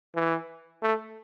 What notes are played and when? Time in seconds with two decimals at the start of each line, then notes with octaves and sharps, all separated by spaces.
0.15 E3
0.83 A3